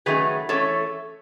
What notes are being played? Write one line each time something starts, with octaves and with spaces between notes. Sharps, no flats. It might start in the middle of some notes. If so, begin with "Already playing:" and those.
D#3 F#3 A3 C#4 G#4 B4
E3 A3 C#4 A4 C#5